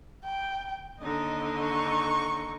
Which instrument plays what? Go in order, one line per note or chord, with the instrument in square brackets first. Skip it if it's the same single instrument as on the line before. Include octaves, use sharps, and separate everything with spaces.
[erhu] G5
[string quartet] D#2 D3 D#4 [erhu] D#5
[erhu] C#6